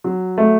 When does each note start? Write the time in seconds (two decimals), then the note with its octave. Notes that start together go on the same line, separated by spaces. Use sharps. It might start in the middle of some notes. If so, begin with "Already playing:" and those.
0.04 F#3
0.38 A3